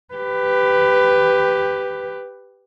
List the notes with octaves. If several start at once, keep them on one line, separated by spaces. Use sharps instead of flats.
G4 B4